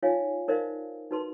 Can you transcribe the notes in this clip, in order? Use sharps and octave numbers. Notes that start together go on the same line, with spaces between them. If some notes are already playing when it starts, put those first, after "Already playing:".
D#4 F4 C#5 E5 F5 G#5
D#4 A#4 C5 D5 E5 F5
D#4 F#4 B4 A5 C6